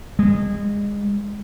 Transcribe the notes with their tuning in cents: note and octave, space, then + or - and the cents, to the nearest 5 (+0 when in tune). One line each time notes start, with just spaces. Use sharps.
G#3 -25